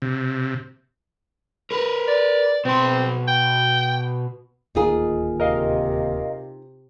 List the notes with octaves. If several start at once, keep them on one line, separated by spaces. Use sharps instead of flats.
C3
A#4 B4
D5
B2 C4 C6
G5
D1 D#2 A#3 D#4 F4 G#4
C3 A#4 D#5 F5